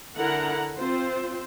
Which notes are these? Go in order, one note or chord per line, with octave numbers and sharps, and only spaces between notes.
D3 E4 A#4 F#5 A#5
C4 F4 C5